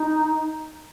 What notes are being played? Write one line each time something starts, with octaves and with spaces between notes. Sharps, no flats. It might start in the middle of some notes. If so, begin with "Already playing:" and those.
Already playing: D#4